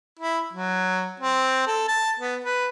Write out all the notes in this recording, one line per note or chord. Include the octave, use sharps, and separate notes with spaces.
E4
F#3
C4
A4
A5
B3
B4